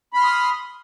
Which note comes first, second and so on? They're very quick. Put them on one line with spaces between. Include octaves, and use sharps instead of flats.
B5 F6 C6 D#6